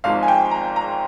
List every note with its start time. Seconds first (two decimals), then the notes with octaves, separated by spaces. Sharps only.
0.04 G#1 G#2 F3 F5
0.23 G#5
0.28 G5
0.51 A#5
0.76 A#5